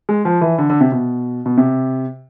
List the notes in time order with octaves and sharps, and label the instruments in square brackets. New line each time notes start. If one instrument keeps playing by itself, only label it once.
[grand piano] G#3
F3
E3
D3
D3
C3
B2
B2
C3